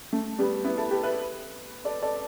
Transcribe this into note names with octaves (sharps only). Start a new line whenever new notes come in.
A3
G3 B3
B3 E4
E4 A4
G4 B4
B4 E5
A4 D5
A4 D5